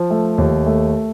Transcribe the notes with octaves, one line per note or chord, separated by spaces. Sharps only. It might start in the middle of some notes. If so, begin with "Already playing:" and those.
Already playing: F3
A3
D#2
A3